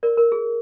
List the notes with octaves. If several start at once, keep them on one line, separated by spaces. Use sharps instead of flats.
A#4 D5
A#4
G#4